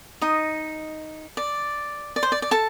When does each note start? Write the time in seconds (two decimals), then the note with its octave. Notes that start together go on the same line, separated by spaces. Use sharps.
0.22 D#4 D#5
1.37 D5
2.16 D5
2.23 C5
2.32 D5
2.42 D5
2.51 A4 A5